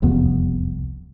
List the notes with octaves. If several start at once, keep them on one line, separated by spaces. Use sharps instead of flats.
E1 C2 F2 B3